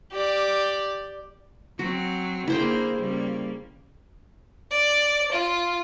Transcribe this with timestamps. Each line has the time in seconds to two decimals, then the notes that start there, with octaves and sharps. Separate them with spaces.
0.12 G4 D5
1.79 F#3 C4 F#4
2.48 D3 A#3 E4 G#4 C5 G5
2.98 C#3 G3 A#3
4.71 D5
5.32 F4